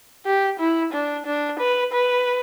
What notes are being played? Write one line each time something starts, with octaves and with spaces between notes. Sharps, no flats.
G4
E4
D4
D4
B4
B4